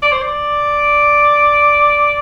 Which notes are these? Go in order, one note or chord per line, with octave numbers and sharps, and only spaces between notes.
D5
C5
D5